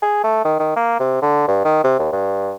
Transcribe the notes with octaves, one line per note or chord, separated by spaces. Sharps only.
G#4
A3
D#3
D#3
A#3
C3
D3
G2
D#3
C3
D#2
G2